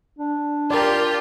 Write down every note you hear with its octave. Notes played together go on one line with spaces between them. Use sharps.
D4
F4 G4 A#4 D5